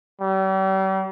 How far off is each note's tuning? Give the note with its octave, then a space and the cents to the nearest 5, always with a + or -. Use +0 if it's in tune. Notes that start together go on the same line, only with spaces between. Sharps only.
G3 -40